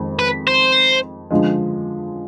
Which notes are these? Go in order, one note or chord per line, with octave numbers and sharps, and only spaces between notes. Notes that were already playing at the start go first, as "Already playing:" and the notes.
Already playing: F2 D#3 G#3
B4
C5
D3 F3 G#3